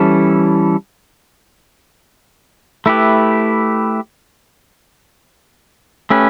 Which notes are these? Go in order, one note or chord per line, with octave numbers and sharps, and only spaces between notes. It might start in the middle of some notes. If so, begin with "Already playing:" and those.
Already playing: E3 G3 C#4 E4 A4
A3 E4 G4 B4
A3 C#4 G4 B4